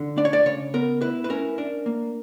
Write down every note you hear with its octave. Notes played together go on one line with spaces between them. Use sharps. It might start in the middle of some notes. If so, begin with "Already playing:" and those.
Already playing: D3
D4 D5
C#5
D5
C#3 C#5
B3 A#4
E4 B4
B4
C#4 A#4
D4 A#4
A#3